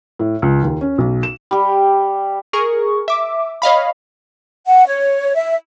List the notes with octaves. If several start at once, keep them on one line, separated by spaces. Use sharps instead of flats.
A2
C#2
D#2
C#4
B1
E7
G3 G4
G#4 A#4 C#6
E5 D6
C#5 D#5 F5 B5
F#5
C#5
E5